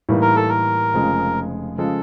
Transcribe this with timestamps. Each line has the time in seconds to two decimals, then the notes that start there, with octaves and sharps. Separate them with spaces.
0.09 A2 E3 G3 A#3 D#4
0.22 A#4
0.36 A4
0.49 A#4
0.94 F1 F2 C#3 F3 G#3
1.78 C#3 F3 G#3 A4